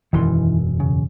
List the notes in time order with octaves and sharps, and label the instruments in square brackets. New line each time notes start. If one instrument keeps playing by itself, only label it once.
[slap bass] E1 F#2 [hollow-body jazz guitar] D#3 E3 C6
[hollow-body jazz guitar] C#3